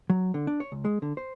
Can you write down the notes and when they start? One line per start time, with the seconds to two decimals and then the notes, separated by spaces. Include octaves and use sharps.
0.10 F#3
0.34 D3
0.47 D4
0.60 C#5
0.72 C#2
0.85 G#3
1.02 D3
1.17 C5